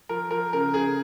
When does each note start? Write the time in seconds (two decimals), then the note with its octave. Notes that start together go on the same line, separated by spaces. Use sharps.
0.09 F3 A#4
0.31 F3 A#4
0.53 C#3 A#4
0.74 C#3 G#4